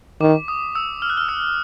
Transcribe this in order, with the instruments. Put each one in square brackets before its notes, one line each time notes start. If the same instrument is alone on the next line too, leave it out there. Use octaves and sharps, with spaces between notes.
[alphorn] D#3 [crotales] D6
[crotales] D#6
E6
F6
F#6
F6
E6